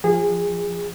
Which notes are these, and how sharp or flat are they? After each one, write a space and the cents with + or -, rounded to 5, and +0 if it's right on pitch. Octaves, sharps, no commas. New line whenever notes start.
F3 +5 G#4 -25